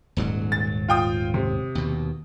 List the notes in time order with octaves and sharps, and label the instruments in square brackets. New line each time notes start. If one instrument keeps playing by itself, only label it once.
[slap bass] D#1 G#2 F#3
[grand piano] A6
F4 G5 D#6
C3
[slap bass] D#2 B2